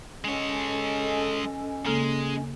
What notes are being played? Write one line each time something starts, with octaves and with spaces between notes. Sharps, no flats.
G#3 C#4 A4 C#5 D#5 G#5
C#3 G#3 A#3 A4